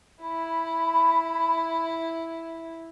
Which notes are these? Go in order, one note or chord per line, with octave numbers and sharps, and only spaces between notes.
E4 B5